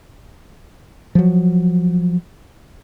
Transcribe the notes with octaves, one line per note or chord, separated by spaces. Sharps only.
F3 F#3